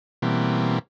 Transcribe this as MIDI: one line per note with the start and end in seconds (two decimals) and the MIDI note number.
0.22 0.79 47
0.22 0.79 52
0.22 0.79 55
0.22 0.79 58
0.22 0.79 60